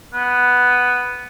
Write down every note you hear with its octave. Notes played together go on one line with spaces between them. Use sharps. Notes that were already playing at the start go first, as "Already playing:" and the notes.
B3